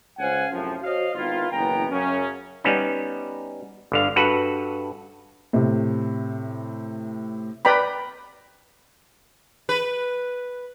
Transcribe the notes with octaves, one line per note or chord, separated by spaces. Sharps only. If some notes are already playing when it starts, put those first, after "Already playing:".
C#2 C5 C#5 F5 F#5 G#5
F#2 A2 C3 F3
F#4 C5 C#5 D#5 F5
G#1 D#3 B3 E4 F4
F#1 B2 E3 B3 G5 A#5
F#2 C#3 C#4
G3 B3 C#4 D#4
G1 D3 F5
G2 F#4 A4 B4 F#5
A2 C3
B4 D5 G5 A#5 B5
B4